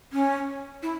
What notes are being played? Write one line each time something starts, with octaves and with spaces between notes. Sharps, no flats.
C#4
E4